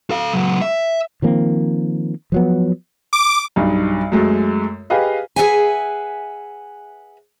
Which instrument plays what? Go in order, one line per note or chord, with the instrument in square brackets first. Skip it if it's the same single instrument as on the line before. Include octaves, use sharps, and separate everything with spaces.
[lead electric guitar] A4 F5
C#2 F#3
E5
[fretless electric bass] D#3 F3 A#3 C4
F3 F#3 B3
[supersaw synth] D6
[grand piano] B1 G2 D#4
F#2 G#3 A3
G4 G#4 B4 D#5 F5
[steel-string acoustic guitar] G#4 A4 B4 E5 F#5 G#5